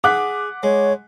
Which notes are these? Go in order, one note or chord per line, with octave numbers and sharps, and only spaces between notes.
G#4 F#5 D6 F#6 B6
G#3 C#5